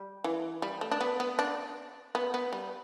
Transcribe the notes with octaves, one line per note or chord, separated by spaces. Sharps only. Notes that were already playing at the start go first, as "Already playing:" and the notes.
Already playing: G3
E3
G3
A3
D4
B3
B3
D4
B3
B3
G3